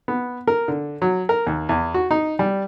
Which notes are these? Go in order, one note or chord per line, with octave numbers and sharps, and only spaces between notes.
B3
A#4
D3
F#3
A#4
D#2
E2
F#4
D#4
G3